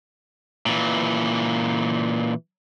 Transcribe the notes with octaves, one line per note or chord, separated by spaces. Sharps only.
A#2 E3